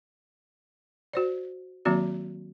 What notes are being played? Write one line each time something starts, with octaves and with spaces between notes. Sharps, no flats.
F#4 C5 D5
D#3 F#3 A#3 C4 F#4 D5